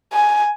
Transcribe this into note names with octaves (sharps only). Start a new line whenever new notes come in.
G#5